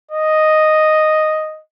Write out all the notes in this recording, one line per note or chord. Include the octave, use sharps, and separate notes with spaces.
D#5